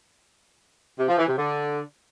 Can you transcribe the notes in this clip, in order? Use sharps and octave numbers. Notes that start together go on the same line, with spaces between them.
C3
F3
E3
C3
D3